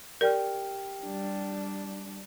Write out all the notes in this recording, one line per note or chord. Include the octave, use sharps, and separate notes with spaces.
G4 A#4 D5 G5 F6
G3 D4